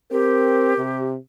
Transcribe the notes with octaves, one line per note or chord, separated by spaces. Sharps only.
C4 G4 A#4
C3